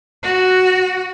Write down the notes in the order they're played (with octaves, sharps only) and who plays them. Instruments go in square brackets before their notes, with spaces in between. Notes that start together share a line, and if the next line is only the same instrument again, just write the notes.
[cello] F#4